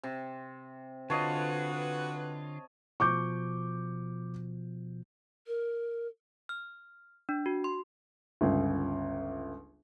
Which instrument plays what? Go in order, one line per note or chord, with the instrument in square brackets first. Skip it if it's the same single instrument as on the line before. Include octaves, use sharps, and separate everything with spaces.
[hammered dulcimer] C3
[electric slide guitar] D3 F4 [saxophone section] F#4 B4 [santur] C#5 D#5 G#5 [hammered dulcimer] A5
[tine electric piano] B2 F3 [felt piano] C#6 D6 G6
[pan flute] A#4
[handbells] F6
D4
F#4
C6
[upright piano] G1 C#2